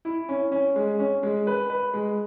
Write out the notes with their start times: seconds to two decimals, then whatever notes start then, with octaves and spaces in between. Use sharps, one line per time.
0.05 E4
0.29 C#4
0.52 C#4
0.76 G#3
0.99 C#4
1.23 G#3
1.47 B4
1.70 B4
1.93 G#3